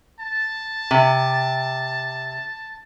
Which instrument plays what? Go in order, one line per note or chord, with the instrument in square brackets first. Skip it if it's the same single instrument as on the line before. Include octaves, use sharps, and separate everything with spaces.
[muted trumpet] A5
[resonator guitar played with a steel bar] C3